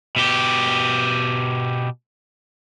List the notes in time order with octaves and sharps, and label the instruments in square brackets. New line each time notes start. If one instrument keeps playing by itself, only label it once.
[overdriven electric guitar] B2 G4